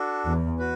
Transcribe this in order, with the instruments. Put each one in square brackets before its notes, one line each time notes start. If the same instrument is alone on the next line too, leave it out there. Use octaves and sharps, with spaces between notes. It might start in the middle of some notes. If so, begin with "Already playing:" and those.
Already playing: [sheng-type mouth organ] D4 F#4 A4
[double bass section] E2
[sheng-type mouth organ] F#4 B4